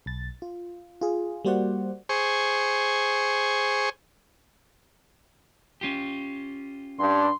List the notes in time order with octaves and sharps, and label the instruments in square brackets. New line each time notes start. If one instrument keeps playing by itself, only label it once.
[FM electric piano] B1 A6
F4
F4 G#4
G3 A#3 F#4 C5 D5 F#5
[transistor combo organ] G#4 C5 C#6
[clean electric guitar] C#4 F4 G4
[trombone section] G2 [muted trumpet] C6